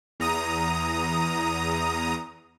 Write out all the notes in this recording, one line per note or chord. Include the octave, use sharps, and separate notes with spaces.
E2 A#5 D#6